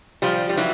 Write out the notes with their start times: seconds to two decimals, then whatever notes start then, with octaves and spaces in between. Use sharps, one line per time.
0.22 F3 G3
0.49 G3
0.57 E3 F#3